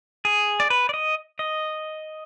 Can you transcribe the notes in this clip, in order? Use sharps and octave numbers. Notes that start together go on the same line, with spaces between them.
G#4
D5
B4
D5
D#5
D#5